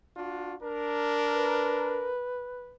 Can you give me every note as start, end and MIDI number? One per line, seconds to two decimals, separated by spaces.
0.16 0.55 62
0.16 0.55 65
0.16 0.55 66
0.63 2.10 62
0.63 2.11 70
1.33 2.75 71